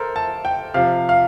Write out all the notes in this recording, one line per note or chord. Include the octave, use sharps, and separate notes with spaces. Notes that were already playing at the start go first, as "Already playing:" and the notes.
Already playing: A4 A#4 C5
A5
G5
C3 F3 F5
F5